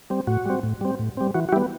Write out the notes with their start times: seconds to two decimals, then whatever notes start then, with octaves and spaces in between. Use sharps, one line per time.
0.10 G3 C4
0.27 A2 F#4
0.46 G3 C4
0.63 A2
0.81 G3 C4
0.99 A2
1.17 G3 C4
1.34 E3 F#4
1.49 F#4
1.52 G3 B3 E4 G4